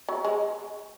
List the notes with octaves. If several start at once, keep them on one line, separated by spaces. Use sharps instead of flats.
F#3
G#3